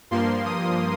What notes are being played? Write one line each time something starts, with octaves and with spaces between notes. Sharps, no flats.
G2 F3 A#3 C6
D#6